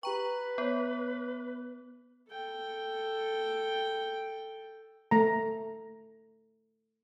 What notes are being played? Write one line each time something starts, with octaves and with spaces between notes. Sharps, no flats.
G4 B4 G5 A#5 C#6
B3 C5 C#5
A4 G5
A3 A#5